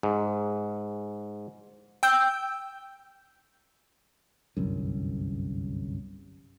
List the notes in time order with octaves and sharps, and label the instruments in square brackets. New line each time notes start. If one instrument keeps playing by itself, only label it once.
[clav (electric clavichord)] G#2
[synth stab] G5 E6 G6
[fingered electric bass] G1 C2 F#2